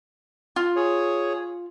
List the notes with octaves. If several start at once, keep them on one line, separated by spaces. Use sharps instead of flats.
F4
G#4 C#5